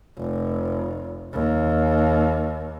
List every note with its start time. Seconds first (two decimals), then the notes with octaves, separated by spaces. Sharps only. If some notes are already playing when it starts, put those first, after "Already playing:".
0.18 F1
1.34 D#2